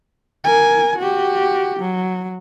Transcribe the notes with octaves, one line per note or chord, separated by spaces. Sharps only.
A#4 G#5
F#4 G4
F#3